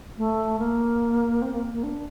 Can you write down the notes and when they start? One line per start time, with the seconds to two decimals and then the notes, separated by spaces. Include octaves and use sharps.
0.18 A3
0.59 A#3
1.42 C4
1.52 A#3
1.73 A#3
1.83 D4